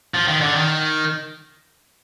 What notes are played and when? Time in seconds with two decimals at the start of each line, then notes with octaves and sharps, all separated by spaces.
0.14 F3
0.28 D#3
0.41 D3
0.55 D#3